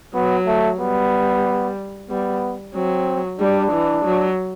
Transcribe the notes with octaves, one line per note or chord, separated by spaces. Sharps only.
F#3 B3
A3
G3 B3
G3 B3
F#3 C4
G3 D4
E3
F#3